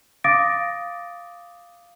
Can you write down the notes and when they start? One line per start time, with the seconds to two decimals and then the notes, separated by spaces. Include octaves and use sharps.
0.24 F5 D6 D#6 A6 A#6 D7